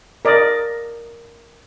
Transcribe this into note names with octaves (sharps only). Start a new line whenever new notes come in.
A#4 D5 D#5